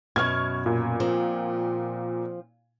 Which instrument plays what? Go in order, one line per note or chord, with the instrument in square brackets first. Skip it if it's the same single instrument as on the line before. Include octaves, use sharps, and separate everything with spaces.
[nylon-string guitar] F#2 B2 [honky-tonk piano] C#6 F6 G#6
[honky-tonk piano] A#2
[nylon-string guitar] F3 C4